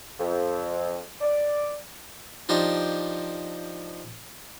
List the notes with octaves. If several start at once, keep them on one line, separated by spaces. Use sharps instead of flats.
F2
D5
F3 D4 D#4 G4 C5